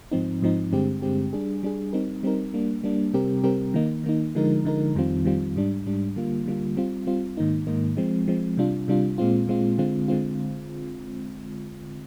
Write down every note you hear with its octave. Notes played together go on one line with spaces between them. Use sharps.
G#2 F3 C4 D#4
G#2 F3 C4 D#4
G2 D3 G#3 C4 G4
G2 D3 G#3 C4 G4
G3 D4 G#4
G3 D4 G#4
G3 C4 D#4 A#4
G3 C4 D#4 A#4
G3 A#3 D4
G3 A#3 D4
C3 G3 C4 G4 A#4
C3 G3 C4 G4 A#4
D#3 A#3 D#4
D#3 A#3 D#4
D3 F3 G#3 D#4 A#4
D3 F3 G#3 D#4 A#4
F2 D#3 G3 C4 F4
F2 D#3 G3 C4 F4
G#2 G3 D4
G#2 G3 D4
D3 G3 A#3 F4
D3 G3 A#3 F4
G3 C4 F4
G3 C4 F4
G#2 D#3 A#3 D#4
G#2 D#3 A#3 D#4
F3 G#3 C4
F3 G#3 C4
C3 G3 D4 F4
C3 G3 D4 F4
A#2 G#3 C4 F4
A#2 G#3 C4 F4
D3 G#3 C4 F4
D3 G#3 C4 F4